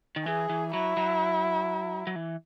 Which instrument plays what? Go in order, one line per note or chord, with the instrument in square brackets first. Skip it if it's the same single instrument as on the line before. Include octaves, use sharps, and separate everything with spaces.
[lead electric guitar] D#3
[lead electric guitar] E3 [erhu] G#4
[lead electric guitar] E3
[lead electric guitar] F#3 [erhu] E4
[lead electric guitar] F#3
F#3
E3